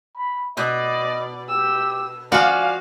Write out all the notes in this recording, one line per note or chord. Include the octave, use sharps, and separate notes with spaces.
B5
B2 D5 D#5
G4 E6
F3 F#4 D5 F5 G#5